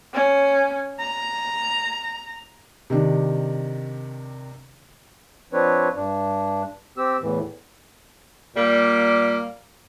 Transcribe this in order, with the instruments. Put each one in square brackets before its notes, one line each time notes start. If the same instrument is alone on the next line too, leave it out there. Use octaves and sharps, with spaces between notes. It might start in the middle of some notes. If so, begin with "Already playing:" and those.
[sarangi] C#4
A#5
[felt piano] C3 D#3 D4
[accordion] F3 C4 D4 B4 C#5
G2 D4
C4 G4 E6
E2 A2 E3
[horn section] A#2 G3 A#3